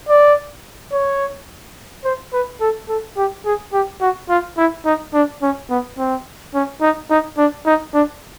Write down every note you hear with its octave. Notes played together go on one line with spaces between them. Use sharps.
D5
C#5
C5
B4
A4
A4
G4
G#4
G4
F#4
F4
E4
D#4
D4
C#4
B3
C4
C#4
D#4
D#4
D4
D#4
D4